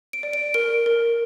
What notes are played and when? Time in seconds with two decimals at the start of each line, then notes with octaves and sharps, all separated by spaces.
0.13 D7
0.23 D5
0.33 D7
0.54 A#4 D7
0.86 A#4